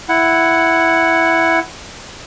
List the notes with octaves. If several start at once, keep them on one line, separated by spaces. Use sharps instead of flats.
E4 F#5